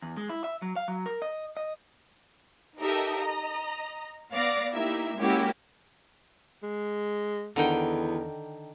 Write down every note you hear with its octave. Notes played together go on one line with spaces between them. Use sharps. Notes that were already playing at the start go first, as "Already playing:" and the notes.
E2
G#3
E4
E5
F#3
F5
F#3
A#4
D#5
D#5
D#4 G4 A4 A#4 D#5 E5
D#5 A#5
B3 D5 F5 A#6
A#3 D#4 E4 G4 A#4 E5
G#3 A#3 C#4 E4 F#4 G4
G#3
E2 D3 D#3 G5